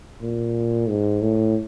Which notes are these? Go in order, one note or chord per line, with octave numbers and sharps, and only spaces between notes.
A#2
G#2
A2